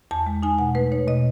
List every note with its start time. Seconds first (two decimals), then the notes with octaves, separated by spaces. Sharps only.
0.11 E2 A5
0.26 G#3
0.43 D#4 G#5
0.59 B2 F#5
0.75 A3 B4
0.91 D#4 C#5
1.08 B2 D#5